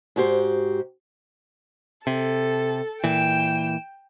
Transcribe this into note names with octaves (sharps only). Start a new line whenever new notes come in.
G#2 F#4 G4 C5
C3 A4
A#2 E3 G5 E7